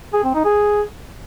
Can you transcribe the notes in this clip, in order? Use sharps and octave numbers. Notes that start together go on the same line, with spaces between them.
G#4
C4
D#4
G#4